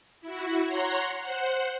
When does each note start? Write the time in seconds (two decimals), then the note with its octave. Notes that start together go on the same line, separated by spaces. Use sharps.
0.21 E4 F#4
0.66 C#5 F#5 A#5 C6
1.19 C5 F#5